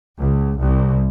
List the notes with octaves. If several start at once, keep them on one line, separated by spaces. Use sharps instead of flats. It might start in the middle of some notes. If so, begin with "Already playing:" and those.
C#2
C2